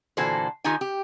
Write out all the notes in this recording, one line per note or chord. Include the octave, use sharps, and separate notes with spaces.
A#2 D3 E3 F#4 A4 C5
D#3 D#4 F4 G4 G#5
G4